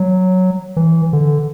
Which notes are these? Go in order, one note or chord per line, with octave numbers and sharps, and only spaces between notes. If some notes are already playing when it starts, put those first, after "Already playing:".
Already playing: F#3
E3
D3